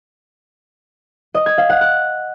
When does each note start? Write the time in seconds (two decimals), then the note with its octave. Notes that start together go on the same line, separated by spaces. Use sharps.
1.34 D#5
1.46 G#6
1.58 F5
1.69 F#5
1.81 F#6